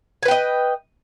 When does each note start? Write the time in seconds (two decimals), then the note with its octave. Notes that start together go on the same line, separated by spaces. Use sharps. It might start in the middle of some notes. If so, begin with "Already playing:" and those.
0.23 G#5
0.25 B4
0.28 G5
0.31 D#5